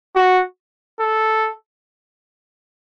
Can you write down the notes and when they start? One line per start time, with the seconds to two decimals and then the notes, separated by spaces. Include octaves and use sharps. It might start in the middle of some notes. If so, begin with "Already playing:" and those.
0.16 F#4
1.00 A4